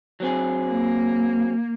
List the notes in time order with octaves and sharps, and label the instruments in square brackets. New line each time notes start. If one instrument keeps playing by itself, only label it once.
[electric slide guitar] F#3 C4 G#4
[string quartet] A#3